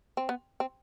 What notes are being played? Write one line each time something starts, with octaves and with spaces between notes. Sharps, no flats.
C4
B3
C4